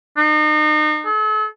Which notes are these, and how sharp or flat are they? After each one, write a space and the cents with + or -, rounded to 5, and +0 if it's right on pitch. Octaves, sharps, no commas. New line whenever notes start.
D#4 -35
A4 -40